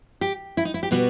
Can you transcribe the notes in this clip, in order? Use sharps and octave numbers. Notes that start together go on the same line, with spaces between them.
G4
E4
D#4
E4
G4
B2 G3 B3 F#4